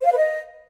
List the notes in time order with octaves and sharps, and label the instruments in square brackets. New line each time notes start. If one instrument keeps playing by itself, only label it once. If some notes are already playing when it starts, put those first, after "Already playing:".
[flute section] C5
F5
B4
D#5